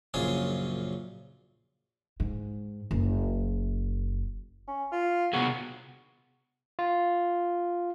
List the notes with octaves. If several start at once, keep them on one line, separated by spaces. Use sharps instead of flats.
A#1 F#2 C#3 F4 G#4
G#2
F#1
C#4
F4
C3 B3 F#4 G#4
F4